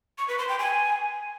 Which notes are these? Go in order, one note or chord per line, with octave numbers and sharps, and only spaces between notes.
C#6
B4
C6
G5
G#5